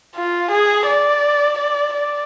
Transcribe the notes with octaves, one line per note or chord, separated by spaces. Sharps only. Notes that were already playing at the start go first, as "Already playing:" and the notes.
F4
G#4
D5
D5
D5